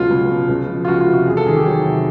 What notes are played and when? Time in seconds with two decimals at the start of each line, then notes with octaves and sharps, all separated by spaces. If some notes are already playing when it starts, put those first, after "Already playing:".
Already playing: C#2 B2 F#3 F4
0.10 C#2
0.30 B2
0.49 C#2
0.69 F3
0.85 F4
0.88 C#2 F#4
1.01 F4
1.07 C3
1.14 F#4
1.27 E2 G#4
1.37 A4
1.46 D#3 G#4
1.56 G4
1.66 F#3
1.85 C3